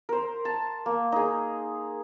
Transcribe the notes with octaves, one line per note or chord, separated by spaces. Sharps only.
A#4 C5
A5
A#3
D#4 G#4